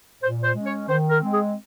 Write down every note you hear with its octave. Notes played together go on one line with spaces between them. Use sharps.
A#2 C5
C5
G#3 C#4
C#5
D#3 C5
A#4
G#3 C4
G#4